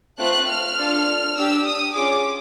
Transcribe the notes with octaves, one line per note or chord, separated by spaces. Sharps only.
A3 C4 F4 F#6
F6
D4 F4 A4
D4 G4 E6
D#6
C#4 F4 G#4 D6